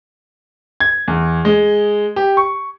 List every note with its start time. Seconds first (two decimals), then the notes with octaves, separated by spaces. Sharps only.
0.80 G#6
1.08 E2
1.45 G#3
2.16 G4
2.37 C#6